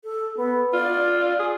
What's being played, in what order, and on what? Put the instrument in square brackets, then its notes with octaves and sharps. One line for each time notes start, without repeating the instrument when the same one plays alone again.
[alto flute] A4
B3
[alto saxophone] F4 [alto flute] D5
[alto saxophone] G#4